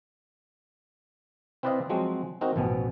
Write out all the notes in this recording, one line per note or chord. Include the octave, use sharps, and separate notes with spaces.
C4 E4 B4 D5 D#5 F5
F3 F#3 G#3 C4 F#4
C4 D#4 F#4 A#4
A1 F#2 B2 F3 B3